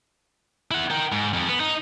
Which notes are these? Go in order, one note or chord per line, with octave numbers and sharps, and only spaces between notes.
E4 F#5
A#4 G5
G#2
F2
B3
D#4